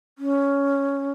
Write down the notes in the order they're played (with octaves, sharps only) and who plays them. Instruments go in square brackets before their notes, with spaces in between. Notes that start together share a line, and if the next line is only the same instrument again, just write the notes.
[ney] C#4